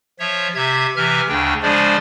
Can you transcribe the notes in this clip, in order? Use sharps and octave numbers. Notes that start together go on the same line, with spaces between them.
F3 C#5 E5
C3 E5 G#6
C3 E3 E5 F6
D2 C#3 D4 G5
C#3 F3 G#3 D4 C5 D5